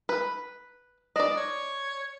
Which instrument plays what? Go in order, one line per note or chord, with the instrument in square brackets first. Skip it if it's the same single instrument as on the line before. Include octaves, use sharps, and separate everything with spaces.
[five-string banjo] B4
[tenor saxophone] D4 [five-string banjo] D5 D#5
[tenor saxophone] C#5